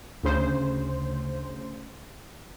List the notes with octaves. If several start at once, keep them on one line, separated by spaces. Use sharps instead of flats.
D2 C#3 C5